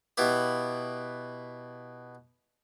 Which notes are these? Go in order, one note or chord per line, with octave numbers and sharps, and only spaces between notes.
B2 B3 E4 G4